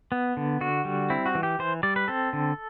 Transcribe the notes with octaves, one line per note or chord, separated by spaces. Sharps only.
B3
D3
D3 F#4
G3
C4 E4
F#4
E3
G4
E3 C5
G3 D5
B4
C4 A4
D3